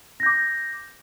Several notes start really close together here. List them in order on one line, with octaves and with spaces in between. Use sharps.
A#6 G6 D6